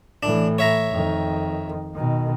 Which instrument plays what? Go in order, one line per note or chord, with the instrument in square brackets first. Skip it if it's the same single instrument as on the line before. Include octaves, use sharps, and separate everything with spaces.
[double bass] A2 E3 [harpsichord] D4
[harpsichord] C#5 E5 A#5
[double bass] F2 D#3
B2 D#3